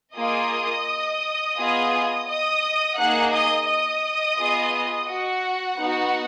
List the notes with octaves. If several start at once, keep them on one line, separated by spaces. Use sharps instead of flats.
A#3 F4 G#4 D#5 D#6
B3 F4 G#4
D#5 D#6
A#3 D#4 G#4 F#5 F#6
D#5 D#6
D#5 D#6
B3 F4 G#4
F#4 F#5
B3 D#4 F#4